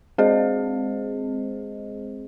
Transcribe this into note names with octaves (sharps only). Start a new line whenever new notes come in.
G#3 C4 G#4 C5 D#5